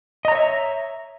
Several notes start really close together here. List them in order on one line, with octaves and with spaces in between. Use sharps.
D#5 A#5 C#5 E5